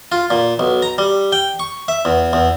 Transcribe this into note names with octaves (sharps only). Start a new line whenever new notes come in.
F4
A#2
B1
A#5
G3
G5
C#6
E5
E2
E2